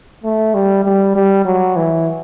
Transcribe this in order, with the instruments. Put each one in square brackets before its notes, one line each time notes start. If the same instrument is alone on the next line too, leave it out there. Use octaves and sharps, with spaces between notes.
[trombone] A3
G3
G3
G3
F#3
E3